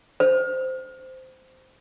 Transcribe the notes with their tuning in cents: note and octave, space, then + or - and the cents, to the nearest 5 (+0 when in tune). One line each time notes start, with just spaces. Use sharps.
C5 -10